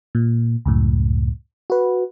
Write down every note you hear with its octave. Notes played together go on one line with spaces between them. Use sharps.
A#2
C#2 F#2 A2
F#4 B4